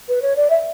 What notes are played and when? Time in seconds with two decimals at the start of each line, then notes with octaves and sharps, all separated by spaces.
0.09 B4
0.22 C#5
0.36 D5
0.50 E5